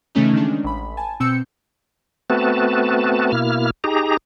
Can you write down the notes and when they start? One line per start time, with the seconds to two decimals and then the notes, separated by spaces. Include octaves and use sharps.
0.15 C#3 E3 A3 C#4 D#4
0.34 D#3 G#3 C#4 D4
0.64 A1 B5
0.97 G#5 A5
1.20 B2 C4 E6 G6 C#7
2.30 A3 B3 C4 F#4 B4 A5
3.32 B2 A#3 E4 F6
3.84 D#4 G4 G#4 A#5